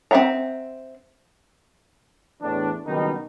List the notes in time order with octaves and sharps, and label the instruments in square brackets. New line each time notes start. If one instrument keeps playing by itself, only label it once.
[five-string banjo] C4 C5 E5 F#5 A#5
[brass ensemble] E2 A2 E3 D4
F#1 B2 D#3 G3 D#4